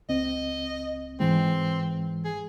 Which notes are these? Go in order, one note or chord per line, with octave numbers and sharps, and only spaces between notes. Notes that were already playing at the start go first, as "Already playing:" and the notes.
C#2 C4 D#5
G#2 E3 G#3 C4
G#4